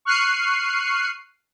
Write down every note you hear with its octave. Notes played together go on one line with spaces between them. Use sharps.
C#6 F6 F#6 C7 C#7 D#7